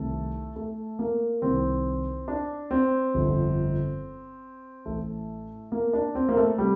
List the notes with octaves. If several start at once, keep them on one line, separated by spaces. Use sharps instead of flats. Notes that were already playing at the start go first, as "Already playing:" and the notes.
Already playing: C2 C3 D#3 A3
A3
A#3
C2 C3 D#3 C4
D4
C4
G1 F2 D3
A1 A2 A3
A#3
D4
C4
A#3
A3
C3 G3